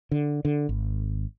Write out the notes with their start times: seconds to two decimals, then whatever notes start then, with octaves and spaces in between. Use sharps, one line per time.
0.11 D3
0.45 D3
0.69 G#1